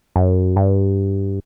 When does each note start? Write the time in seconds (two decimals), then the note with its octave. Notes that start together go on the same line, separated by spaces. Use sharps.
0.16 F#2
0.56 G2